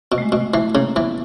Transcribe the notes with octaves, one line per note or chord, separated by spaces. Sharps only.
B2
A3
G#3
B2
E3 A3
A3
C#3 A#3
E3 B3